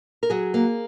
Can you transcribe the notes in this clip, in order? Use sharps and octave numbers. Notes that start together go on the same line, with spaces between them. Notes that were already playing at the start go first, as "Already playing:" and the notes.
A#4
F#3 G#4
A#3